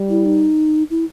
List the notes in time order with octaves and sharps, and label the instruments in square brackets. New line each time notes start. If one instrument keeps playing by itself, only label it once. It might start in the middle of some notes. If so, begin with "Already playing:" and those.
Already playing: [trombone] G3
[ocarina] E4
D#4
E4